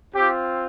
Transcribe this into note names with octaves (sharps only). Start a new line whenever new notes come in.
C4 F4 G4